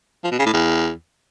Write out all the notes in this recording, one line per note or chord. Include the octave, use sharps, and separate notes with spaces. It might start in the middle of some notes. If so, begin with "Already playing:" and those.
F3
B2
C#3
A2
E2